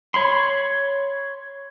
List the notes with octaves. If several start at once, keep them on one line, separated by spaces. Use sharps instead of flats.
C#5 B5 C6